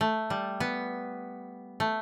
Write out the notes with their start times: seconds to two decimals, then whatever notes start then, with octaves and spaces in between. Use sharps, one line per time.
0.01 A3
0.30 G3
0.60 B3
1.80 A3